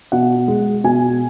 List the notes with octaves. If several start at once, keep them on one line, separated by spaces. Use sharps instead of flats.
B2 F#5
G#3
B2 G#5